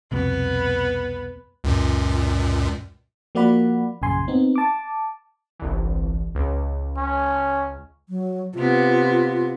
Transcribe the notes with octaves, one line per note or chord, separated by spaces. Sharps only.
C2 F2 B2 B3
C#2 F#2 A#2
F3 A#3 F#4 D5 F#5 B5
A#1 F#2 C#3 G#5 C6
B3 C4 D#4
A5 D6
G1 C2 E3
C#2
C#4
F#3
C3 B3 F4